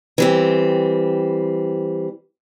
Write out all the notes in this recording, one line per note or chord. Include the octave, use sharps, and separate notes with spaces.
E3 G3 C4